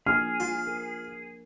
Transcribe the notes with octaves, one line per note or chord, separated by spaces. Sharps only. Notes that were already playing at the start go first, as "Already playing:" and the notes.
F3 A#3 D4 G#4 F6
F4
A#4